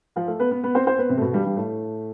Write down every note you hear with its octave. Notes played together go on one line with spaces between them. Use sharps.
F3 F4
A3 A4
B3 B4
B3 B4
B3 B4
C4 C5
C4 C5
B3 B4
C3 C4
A3
B2 B3
G2 G3
G2 G3
A2 A3